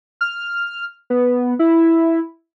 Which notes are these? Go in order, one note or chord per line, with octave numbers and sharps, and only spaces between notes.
F6
B3
E4